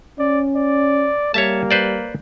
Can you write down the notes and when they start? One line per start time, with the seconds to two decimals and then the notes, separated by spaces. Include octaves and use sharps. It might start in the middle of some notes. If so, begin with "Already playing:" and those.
0.19 C#4 D5
0.56 D5
1.34 G3 A#3 C#5 E5 A5
1.71 B4 C5 D5